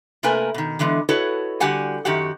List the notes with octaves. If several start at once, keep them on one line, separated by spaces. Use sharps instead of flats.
C3 A3 A#3 A#4 B4 G#5
B2 D#3
D3 E3 G#3 B3
E4 F#4 A4 B4 C#5 D#5
D3 G3 F#4 G4 F#5 G#5
F#2 D#3 F#4 G4 F#5